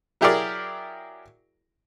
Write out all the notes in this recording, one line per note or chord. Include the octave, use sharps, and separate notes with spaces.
F#3 E4 G4 G#4 A#4 D5